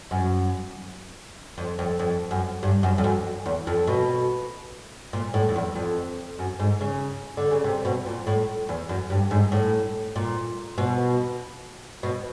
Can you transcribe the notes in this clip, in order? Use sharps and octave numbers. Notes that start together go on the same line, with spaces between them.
F#2
F2
F2
F2
F#2
G2
F#2
F2
F#2
E2
F2
B2
A#2
A2
F2
E2
F2
F#2
G#2
C#3
D3
C#3
C3
B2
A#2
A2
E2
F#2
G2
G#2
A2
A#2
B2
B2